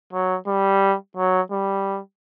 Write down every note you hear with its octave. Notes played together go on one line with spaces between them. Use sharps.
F#3
G3
F#3
G3